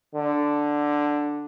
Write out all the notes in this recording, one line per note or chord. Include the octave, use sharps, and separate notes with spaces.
D3